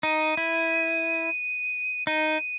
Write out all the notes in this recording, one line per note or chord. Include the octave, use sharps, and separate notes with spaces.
D#4 D#7
E4
D#4 D#7